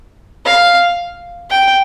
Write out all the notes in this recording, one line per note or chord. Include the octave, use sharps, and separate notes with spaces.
F5
G5